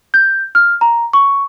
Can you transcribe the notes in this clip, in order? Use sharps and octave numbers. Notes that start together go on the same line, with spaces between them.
G6
F6
A#5
C#6